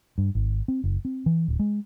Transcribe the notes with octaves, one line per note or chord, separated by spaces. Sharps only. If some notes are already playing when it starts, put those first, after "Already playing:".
G2
G#1
C4
F#1
C4
E3
D1
G#3